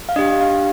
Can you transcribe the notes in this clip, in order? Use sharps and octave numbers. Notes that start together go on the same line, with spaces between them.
F5
D4 G4 D#5
F5